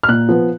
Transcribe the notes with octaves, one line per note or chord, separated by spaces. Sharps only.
F6
A#2 F#6
F3 B3